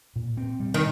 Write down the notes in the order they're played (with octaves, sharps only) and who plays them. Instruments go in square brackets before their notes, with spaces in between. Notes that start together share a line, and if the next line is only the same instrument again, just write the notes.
[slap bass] A#2
C4
G3
[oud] D#3